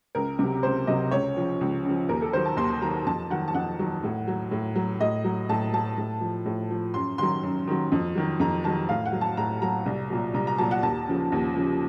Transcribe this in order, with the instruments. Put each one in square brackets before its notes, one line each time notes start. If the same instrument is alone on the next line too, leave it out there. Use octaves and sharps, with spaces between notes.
[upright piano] C#2 A#4
C3 F#3
C#2 C5
C3 F#3 D#5
C#2 C#5
C#3 F3
C#2
C#3 F3
D#2 A#4
A4
D#3 F#3 C5
A5
D#2 C6
D#3 F#3 A#5
F2 A5
D#3 F#3 F#5
A5
F2 F#5
D#3 F#3
A2
F#3
A2
F#3
A2 D#5
F#3
A2 A5
F#3 A5
A2
F3
A2
F3
F#2 C6
D#3 F#3 C6
F#2
D#3 F#3
F2
D#3 F#3
F2 A#5
D#3 F#3 A5
A2 F5
F#5
F#3
A5
A2 A#5
F#3 A#5
C2
A#2 F#3
C2 A#5
A#5
A#2 F#3 A5
F#5
D#2 A5
C#3 F3
D#2
C#3 F3